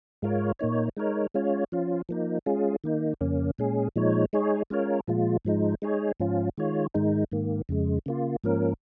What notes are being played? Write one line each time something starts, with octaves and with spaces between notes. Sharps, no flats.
G#2 G#3 F4 A#4 C#5
A#2 A#3 D#4 C#5
G#3 D#4 A#4 C#5
G#3 C#4 F4 C#5
F3 C#4 F4
F3 A#3 D#4
G#3 C#4 F4 G#4
D#3 A#3 D#4
F2 C#3 A#3 C#4
A#2 G#3 C#4 G#4
A#2 F3 G#3 D#4 C#5
G#3 D#4 G#4 C#5
G#3 C#4 F4 A#4 C#5
A#2 F3 G#3 F4
G#2 F3 G#3 D#4
G#3 D#4 G#4 C#5
G#2 F3 C#4 F4
D#3 G#3 F4 C#5
G#2 D#3 G#3 D#4
G#2 D#3 A#3
F2 C#3 G#3
C#3 A#3 F4
G#2 F3 A#3 C#4 A#4